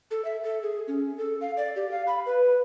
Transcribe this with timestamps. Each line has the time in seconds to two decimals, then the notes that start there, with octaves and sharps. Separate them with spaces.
0.11 A4
0.25 E5
0.44 A4
0.63 G#4
0.88 C#4
1.18 A4
1.41 F5
1.57 D5
1.76 G4
1.91 F5
2.07 B5
2.26 B4